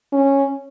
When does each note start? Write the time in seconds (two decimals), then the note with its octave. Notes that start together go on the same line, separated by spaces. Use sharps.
0.12 C#4